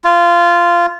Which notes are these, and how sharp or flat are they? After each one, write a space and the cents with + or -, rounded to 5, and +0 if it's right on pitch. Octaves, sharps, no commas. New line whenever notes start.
F4 -15